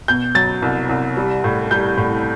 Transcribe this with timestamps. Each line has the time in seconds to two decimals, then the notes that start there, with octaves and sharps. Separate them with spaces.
0.08 B2 G6
0.35 F#3 A6
0.62 C2
0.89 C2
1.17 G3
1.44 A2
1.71 G3 G6
1.97 A2